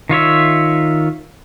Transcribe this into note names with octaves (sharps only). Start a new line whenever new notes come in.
D#3 F4 C#5 E5